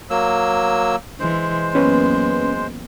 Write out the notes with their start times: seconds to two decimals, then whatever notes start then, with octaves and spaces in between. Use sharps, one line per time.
0.10 F#3 A#3 E6
1.20 E3 G#3 C5
1.75 F#2 A#3 B3 C#4 B4